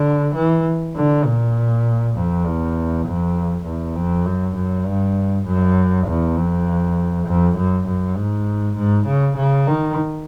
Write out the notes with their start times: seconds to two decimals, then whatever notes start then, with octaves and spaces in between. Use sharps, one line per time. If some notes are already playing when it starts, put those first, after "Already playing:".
Already playing: D3
0.35 E3
0.96 D3
1.25 A#2
2.15 F2
2.45 E2
3.06 F2
3.66 E2
3.95 F2
4.26 F#2
4.56 F#2
4.86 G2
5.46 F#2
6.07 E2
6.37 F2
7.27 F2
7.58 F#2
7.87 F#2
8.17 G#2
8.77 G#2
9.07 C#3
9.37 C#3
9.67 D#3